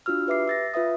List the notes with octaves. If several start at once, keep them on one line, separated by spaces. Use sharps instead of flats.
D4 F4 F#4 E6 F6
G4 B4 E5 D6 C7
E6 A6 A#6
F4 B4 E5 D#6